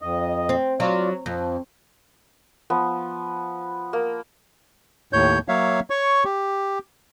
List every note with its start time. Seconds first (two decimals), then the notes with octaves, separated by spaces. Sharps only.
0.02 F2 D#5
0.49 C4
0.80 F#3 F4 D5
1.26 F2 F3
2.70 F3 B3
3.93 A#3
5.13 D#2 A2 C#5 G6
5.48 F#3 A#3 C#5 E5 F5
5.90 C#5 C#6
6.24 G4